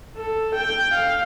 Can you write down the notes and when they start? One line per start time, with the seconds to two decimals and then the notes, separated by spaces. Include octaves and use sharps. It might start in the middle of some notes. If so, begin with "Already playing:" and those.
0.16 A4
0.55 G5
0.94 F5